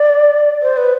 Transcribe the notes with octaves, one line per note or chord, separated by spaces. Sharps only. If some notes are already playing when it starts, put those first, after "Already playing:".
Already playing: D5
C5
B4